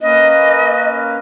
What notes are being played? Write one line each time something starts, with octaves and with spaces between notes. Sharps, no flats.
A#3 C#4 B4 D#5